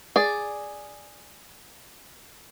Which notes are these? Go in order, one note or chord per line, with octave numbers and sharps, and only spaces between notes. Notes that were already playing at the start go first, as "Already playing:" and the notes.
G#4 D5